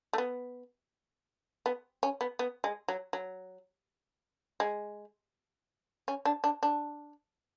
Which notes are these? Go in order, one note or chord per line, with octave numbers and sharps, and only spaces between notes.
A3
B3
B3
C#4
B3
B3
G#3
F#3
F#3
G#3
C#4
D4
D4
D4